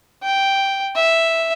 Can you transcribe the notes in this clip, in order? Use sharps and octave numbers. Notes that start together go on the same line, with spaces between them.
G5
E5